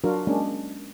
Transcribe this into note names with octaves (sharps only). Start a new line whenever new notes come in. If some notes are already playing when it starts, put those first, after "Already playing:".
F#3 D4 F4 F#4 A#4
G#3 A#3 C#4 D4